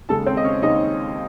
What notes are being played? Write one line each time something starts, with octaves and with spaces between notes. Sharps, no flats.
D#2 C#3 G#3 A4 A5
C4 C5
D#5
C#4 C#5
D#2 C#3 G#3 D#4 D#5